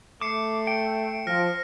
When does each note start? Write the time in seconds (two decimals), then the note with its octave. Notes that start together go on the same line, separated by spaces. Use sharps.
0.21 A3 D6 C7 C#7 E7
0.67 G5 C#7
1.27 F3 F6 A#6